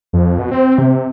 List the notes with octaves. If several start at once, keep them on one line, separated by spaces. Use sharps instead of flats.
F2
B2
C4
C3